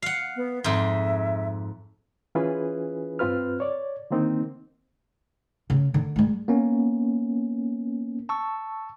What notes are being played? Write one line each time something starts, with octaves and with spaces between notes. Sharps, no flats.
F5 F#5
B3
F2 G#2 E5
E3 C#4 E4 F4 G#4 B4
G2 C4 F4 B4 F6
C#5 D5
D3 D#3 A#3 C4 D#4
C#3
D3
G3 G#3
A#3 B3 C#4
A5 C#6 E6